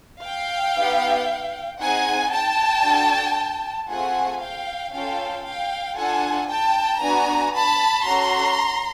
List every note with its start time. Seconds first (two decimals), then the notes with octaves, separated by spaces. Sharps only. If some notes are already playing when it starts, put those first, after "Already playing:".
0.23 F5 G5
0.76 B3 D#4 G4
1.80 C4 D#4 G#4 F#5 G#5
2.32 G5 A5
2.84 D4 F#4 A4
3.89 A3 C4 F4 G#4 F#5 G#5
4.41 F5 G5
4.93 C#4 F4 A4 F5 G5
5.45 F5 G5
5.97 D4 F4 A4 F#5 G#5
6.49 G5 A5
7.01 B3 D4 F#4 G#5 A#5
7.54 A5 B5
8.06 C#4 F#4 A4 A#5 C6